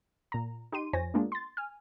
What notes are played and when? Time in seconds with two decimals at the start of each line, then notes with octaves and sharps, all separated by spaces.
0.32 A#2 A#5
0.72 D#4 G4 C6 D#7
0.93 F2 F3 C5 C#5 G#5 A#6
1.14 G#3 A#3 B3 D4 F4 G#4
1.32 C6 A6
1.57 G#5 F6